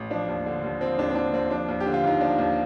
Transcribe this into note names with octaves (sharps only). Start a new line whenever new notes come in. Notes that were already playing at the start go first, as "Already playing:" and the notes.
Already playing: A1
F3 D4
D#2
D3
D#2
F3 C4
D#2 D4
C4
D3 D4
D#2 C4
F3 D4
D#2
G4
D3
F4
D#2 D#4
F3 D4
D#2